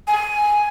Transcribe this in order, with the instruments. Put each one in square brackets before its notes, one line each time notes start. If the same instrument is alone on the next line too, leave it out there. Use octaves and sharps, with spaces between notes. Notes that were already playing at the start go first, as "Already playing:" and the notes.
[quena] G#5